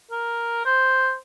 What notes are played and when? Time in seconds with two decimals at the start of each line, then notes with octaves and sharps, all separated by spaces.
0.11 A#4
0.65 C5